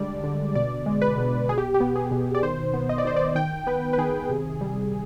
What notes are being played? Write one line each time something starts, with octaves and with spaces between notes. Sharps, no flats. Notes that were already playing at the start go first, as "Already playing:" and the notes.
Already playing: D3 G3 G#3 D4 D5
D3
B2 D5
G#3
B4
B2
B2 G#4
G4
G4
B3
G#4
B2
D5
D#3 C5
B3
D#5
D5
D#3 C5
D5
D#3 G5
B3 B4
B4
D#3 G#4
C3
G3